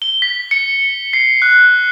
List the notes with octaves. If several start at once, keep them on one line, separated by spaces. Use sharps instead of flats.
G7
B6
C#7
C7
F#6